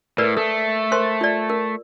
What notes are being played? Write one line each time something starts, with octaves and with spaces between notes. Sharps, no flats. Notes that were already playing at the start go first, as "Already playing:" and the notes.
A2 A#4 B4 D5
A3 A4
A#4 C5 C6
F4 D5
A#4